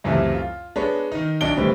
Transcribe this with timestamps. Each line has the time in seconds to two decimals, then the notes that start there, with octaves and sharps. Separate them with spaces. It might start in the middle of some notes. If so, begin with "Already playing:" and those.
0.04 C#2 F#2 C3 E3 A3
0.35 F4
0.76 G#3 B3 D4 B4 C#5
1.12 D#3 D#4
1.41 B1 F#3 D4 D#5 D7 G7
1.57 D1 D2 A2 G3 C4 B4